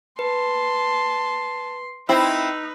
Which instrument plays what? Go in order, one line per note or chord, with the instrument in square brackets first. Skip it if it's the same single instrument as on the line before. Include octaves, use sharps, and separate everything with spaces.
[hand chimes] B4 [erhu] A5 [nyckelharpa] C6
[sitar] C4 E4 [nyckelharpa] D#4 [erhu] B4 [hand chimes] E6